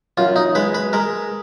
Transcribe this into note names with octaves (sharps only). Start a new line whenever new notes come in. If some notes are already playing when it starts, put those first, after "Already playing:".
F#2 F4
D#4
G#3 B4
B4
G#3 A#4